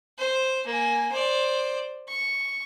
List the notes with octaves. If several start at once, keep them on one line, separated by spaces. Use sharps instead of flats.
C5
A#3 G#5
C5 D5
C#6